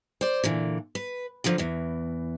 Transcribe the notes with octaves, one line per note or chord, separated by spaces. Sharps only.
C5 D5
A#2 D3 E3
B4
D3 F3 F#3 F4
E2 E3